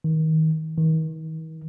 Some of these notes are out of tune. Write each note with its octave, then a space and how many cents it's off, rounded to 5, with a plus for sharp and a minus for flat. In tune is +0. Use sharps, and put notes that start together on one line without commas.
D#3 +30
D#3 +45